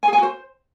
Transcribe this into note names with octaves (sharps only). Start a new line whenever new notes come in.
G#5
G#4
G#5
F#4
C5